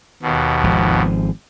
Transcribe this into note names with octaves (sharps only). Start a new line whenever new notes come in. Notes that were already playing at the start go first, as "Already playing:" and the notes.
D#2 B2
G#1 F3